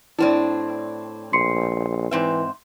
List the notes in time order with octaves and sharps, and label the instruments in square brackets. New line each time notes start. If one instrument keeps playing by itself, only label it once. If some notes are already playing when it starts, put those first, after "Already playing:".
[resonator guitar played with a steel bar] A2 C4 D4 [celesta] E4 D5
[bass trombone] A#1 [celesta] C6 C7 C#7
[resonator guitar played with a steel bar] G#2 C4 E5 [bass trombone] E3